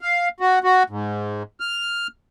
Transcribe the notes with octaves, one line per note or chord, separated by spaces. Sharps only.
F5
F#4
F#4
G#2
F6